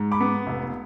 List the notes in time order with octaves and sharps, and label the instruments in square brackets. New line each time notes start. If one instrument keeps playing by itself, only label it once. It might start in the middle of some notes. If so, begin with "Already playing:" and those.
Already playing: [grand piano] G#2
B5 D6
B3
F1